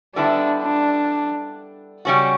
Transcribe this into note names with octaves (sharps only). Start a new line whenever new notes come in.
D3 G3 B3 D4 E4
D4
C#3 G3 C#4 F#4